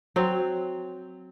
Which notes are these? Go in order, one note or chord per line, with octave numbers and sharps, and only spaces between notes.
F#3 C4